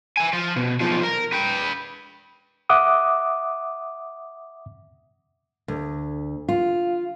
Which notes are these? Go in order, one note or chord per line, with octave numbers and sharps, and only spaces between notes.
E5 G#5
F3
B2
B1 F3
A#4
B4 G5
E5 F#5 D6 D#6
D2
F4